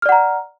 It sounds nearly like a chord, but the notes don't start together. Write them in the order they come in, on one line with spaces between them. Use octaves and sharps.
F6 D5 F#5 A#5